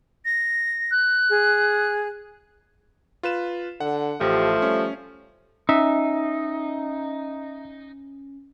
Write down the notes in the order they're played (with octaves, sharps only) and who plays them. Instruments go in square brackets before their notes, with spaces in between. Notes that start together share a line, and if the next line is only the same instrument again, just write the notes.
[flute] A#6
[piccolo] F#6
[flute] G#4
[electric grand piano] F4 B4 E7
[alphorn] D3 [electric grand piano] F#5
[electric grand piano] A1 [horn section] F3 [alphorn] A3 [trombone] G4
[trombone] G3 [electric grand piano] C#4
[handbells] C#4 [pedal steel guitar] D#4 [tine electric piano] E5